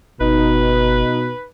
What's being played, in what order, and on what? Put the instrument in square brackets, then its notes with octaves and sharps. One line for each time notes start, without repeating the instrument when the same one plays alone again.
[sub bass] G1 [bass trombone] B2 [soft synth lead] D#4 [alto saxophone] B4